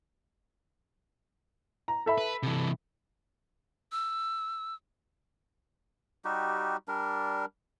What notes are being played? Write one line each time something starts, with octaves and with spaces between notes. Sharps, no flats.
A#5
A4 E5 B5
B4
C3 E3
E6
G3 D#4 F#4 G4
G3 D4 A#4